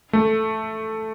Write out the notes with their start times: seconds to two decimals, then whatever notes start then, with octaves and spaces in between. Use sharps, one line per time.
0.13 A3